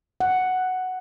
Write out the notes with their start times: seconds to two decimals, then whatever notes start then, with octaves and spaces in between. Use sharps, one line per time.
0.20 F#5